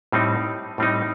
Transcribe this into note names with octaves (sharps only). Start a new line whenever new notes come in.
A2 G3 C4 D#4
A2 G3 C4 D#4